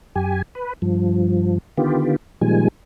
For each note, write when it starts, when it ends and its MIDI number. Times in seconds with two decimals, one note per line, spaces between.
0.15 0.42 42
0.15 0.42 67
0.15 0.42 80
0.55 0.73 71
0.82 1.58 43
0.82 1.58 53
1.77 2.16 50
1.77 2.16 51
1.77 2.16 59
1.77 2.16 65
1.77 2.16 67
2.41 2.68 46
2.41 2.68 51
2.41 2.68 53
2.41 2.68 55
2.41 2.68 56
2.41 2.68 80